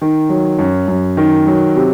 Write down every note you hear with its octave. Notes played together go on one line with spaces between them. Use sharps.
D#3
F#3
F#2
F#2
D#3
F#3
C3